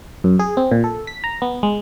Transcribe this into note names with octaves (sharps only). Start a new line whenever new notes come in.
F#2
G#4
C4
A#2
A4
B6
A#5
B3
G#3